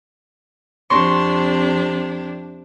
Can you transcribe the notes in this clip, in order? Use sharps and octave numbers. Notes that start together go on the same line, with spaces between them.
F2 C3 D4 C6 C#6 A#6